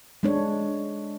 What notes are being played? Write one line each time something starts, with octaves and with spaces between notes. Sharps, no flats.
G#3 D4 C#5